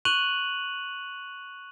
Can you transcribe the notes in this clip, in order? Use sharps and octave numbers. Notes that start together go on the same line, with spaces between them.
C#6 F#6 D#7 F7 F#7